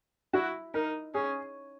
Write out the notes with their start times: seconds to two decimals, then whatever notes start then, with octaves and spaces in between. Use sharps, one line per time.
0.33 E4 F#4
0.74 D#4 A#4
1.14 C#4 G#4